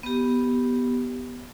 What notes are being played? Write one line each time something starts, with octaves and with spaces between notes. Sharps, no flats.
B3 G4